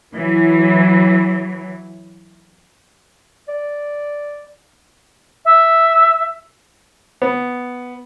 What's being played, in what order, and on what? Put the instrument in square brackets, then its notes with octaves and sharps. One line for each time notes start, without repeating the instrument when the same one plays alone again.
[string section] E3 F#3
[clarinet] D5
[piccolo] E5
[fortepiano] B3